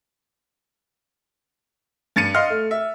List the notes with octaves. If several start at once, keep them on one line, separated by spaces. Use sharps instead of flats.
G2 A6 C#7 D#7
D#5 F5 C6 F6
A3
E5